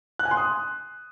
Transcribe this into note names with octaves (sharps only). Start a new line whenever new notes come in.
F#6
G#5
C6
D#6